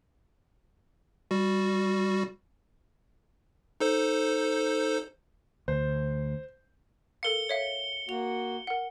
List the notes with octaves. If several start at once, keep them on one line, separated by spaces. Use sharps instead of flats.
G3 F#4
D#4 A4 C5
D2 C5
A4 A#4 F5 C#7 G7
C#5 E5 F5
A#3 F#4 F7
A#4 F#5